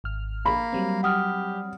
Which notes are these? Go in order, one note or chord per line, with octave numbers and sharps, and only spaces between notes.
G#1 F6
A#3 B5
F#3 G3 C4
G4 F#5 D#6 F6